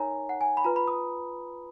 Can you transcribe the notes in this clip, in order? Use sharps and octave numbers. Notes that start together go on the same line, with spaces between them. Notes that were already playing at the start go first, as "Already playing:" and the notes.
Already playing: D#4 A#4 C#5 G#5 A#5
F#5
G#5
B5
F4 B4 A#5
B5
D#6